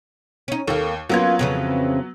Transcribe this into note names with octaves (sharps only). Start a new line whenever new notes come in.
C#4 D#4
D#2 A#3 A4
F#3 A#3 B3 C#4 F4 G#6
F2 C#3 E3